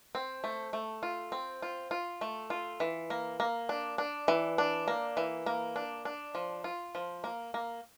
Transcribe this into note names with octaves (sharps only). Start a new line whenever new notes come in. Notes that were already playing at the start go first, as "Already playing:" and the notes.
C4
A3
A3
F4
C4
F4
F4
A3
F4
E3
A#3
A#3
D4
D4
E3
D4
A#3
E3
A#3
D4
D4
F3
F4
F3
A#3
A#3